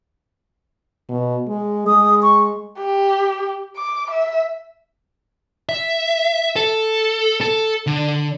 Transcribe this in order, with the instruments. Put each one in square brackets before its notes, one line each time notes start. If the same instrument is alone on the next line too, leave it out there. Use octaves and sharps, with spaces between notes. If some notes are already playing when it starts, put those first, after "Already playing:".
[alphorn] B2
G#3
[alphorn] G#3 [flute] D#6
[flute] C#6
[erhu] G4
D6
E5
[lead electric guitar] E5
A4
A4
D3